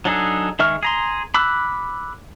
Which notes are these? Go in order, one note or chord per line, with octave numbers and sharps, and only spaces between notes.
F#3 D4 D#4 G#4 A4
D#3 G#3 E5 C#6 F6
G#4 A#5 C6
B5 D6 E6 F#6